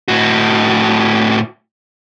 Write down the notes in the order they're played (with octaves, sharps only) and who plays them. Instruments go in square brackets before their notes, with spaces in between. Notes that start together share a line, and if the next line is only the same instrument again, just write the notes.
[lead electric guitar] A2 F#4